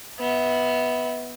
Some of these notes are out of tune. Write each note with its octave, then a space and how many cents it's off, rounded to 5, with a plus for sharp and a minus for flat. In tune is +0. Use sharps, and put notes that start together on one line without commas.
B3 +0 E5 -30